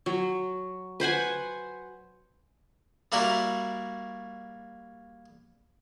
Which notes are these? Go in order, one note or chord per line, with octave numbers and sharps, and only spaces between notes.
F#3
B4 C5 F#5 G#5
G3 A#3 E4 F#4 A#4